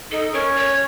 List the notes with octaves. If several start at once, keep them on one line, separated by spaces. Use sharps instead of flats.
D#4 A4
C#4 A#4
C#5